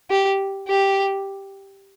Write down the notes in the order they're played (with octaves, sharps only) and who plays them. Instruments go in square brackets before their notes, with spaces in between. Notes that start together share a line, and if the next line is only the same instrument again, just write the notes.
[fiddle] G4
G4